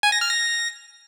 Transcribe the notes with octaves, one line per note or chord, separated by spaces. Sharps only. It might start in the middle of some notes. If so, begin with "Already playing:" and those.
G#5
A#6
F6
A#6